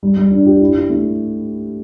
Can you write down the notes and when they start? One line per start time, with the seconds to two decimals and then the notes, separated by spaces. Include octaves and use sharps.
0.03 G3
0.17 G3
0.31 D4
0.46 G4
0.61 E4
0.75 E4
0.90 A3